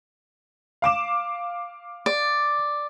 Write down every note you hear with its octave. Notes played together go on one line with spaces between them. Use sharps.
F5 D6 E7
D5